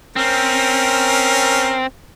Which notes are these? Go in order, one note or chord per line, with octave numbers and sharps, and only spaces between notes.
C4 C#4 A#4